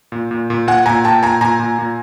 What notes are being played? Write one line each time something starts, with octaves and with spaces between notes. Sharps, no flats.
A#2
A#2
A#2
A#2 F#5 G#5
A#2 G#5 A#5
A#2 G5 A5
A#2 G#5 A#5
A#2 G#5 A#5
A#2
A#2